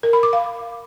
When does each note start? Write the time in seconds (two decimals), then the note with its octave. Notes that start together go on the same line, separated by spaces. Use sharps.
0.03 A#4
0.13 B5
0.23 D6
0.33 F5